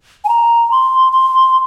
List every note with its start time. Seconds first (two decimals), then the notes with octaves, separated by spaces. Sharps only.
0.25 G#5
0.29 A#5
0.71 C6
1.12 C6